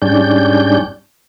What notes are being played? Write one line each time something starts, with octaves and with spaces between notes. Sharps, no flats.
G#2 G3 C#4 D4 G6